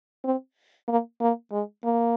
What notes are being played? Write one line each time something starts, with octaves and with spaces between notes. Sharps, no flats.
C4
A#3
A#3
G#3
A#3